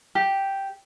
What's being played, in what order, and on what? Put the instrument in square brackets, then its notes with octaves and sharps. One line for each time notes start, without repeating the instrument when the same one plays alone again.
[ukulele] G4